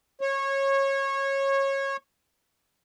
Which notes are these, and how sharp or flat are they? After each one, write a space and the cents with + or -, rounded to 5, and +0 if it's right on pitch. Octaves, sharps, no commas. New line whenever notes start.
C#5 -20